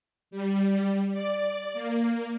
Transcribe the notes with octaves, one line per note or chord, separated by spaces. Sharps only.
G3
D5
A#3